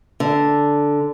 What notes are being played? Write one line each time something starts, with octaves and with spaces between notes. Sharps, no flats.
D3